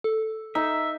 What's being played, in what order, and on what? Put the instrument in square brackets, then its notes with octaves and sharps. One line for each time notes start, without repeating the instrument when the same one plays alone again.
[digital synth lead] A4
[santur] D#4 [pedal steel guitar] E5